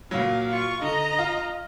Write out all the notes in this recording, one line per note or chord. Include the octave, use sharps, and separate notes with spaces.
A#2 F#3 F5
F4 C#6
D3 D#5 A#5
F4